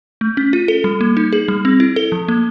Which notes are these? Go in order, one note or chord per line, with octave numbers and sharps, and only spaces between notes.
A3
C#4
F4
A4
G3
A#3
D#4
G#4
G3
C4
E4
A4
F3
A#3